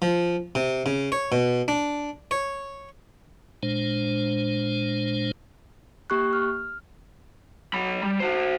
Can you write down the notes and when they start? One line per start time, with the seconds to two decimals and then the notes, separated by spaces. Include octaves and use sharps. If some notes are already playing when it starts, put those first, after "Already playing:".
0.02 F3
0.55 C3
0.86 C#3
1.12 C#5
1.32 B2
1.68 D4
2.31 C#5
3.63 A#2 G#3 D4 C5
6.10 A#3 G4 C#6 F#6
6.33 F6
7.74 F#3 B5
8.03 G3
8.20 F#4 C5